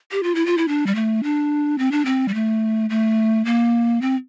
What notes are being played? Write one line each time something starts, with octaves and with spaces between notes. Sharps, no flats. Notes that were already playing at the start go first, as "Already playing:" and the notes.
G4
F4
E4
F4
E4
D4
G3
A3
D4
C4
D4
C4
G3
A3
A3
A#3
C4